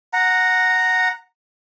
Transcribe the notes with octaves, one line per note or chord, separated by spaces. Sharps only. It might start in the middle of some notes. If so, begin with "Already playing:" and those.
F#5 A#5